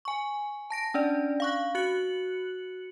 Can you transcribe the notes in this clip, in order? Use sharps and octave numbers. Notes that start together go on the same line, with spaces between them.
G#5 C#6
A5 A#6 D7
C#4 D4 D5
F5 C#6 F#6
F#4 F#6 C#7 F#7